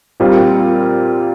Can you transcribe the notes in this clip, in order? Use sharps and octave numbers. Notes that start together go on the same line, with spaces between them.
A#2 G3 C4 F4